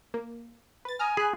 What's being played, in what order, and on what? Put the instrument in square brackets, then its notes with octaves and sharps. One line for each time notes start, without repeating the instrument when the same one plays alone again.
[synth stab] A#3
B4 A6
[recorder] G#5 [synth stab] A#5 D#6 F6
[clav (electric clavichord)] G#4 [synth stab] B5 F#6